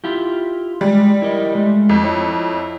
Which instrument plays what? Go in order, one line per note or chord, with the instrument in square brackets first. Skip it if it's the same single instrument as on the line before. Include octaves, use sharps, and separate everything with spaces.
[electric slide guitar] E4 F4 G4
[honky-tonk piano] G3 [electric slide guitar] G#3
[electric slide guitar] E4 A#4 D#5
G#3 A3
[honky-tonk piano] F2
[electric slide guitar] E4 C#5